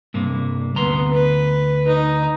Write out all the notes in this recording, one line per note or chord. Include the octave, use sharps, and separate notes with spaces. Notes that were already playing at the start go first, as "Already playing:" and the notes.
G2 C3 A#3
D2 B3 A#5 C6
B4
D#4